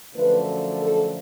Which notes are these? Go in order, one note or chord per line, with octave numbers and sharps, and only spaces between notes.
F#2 D3 F3 A3 B4
A4